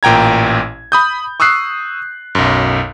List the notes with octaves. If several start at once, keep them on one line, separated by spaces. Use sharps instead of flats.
A1 A#2 G5 A#5 G#6
B5 D#6 G6
C#6 D#6 E6 F#6 C7
B1 F#2